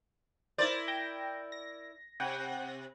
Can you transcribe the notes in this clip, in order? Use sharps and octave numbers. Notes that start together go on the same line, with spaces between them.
E4 A#4 C5 D5 A6
G5 G6 A#6
A#6
C3 F#5 G5